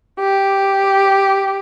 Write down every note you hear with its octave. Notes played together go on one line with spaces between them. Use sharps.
G4